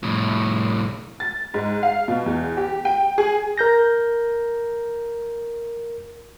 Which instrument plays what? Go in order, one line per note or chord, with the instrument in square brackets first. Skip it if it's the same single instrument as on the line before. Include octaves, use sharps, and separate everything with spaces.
[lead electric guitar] C2 A2
[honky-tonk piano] A6
G#2
F5
B2
E2
G4
G5
G#4
[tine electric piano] A#4 G6 A#6